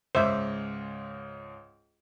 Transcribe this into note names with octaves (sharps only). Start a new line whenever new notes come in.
C#2 G#2 C5 E5 D6